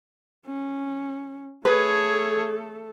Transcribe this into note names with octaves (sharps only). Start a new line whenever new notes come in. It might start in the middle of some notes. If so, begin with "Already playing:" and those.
C#4
A3 G#4 A4 B4 C#5